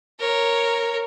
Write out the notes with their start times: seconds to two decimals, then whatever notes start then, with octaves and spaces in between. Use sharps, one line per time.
0.19 A#4 C#5